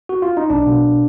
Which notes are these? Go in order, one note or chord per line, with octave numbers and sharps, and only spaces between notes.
F#4
F4
D#4
B1 D4
B2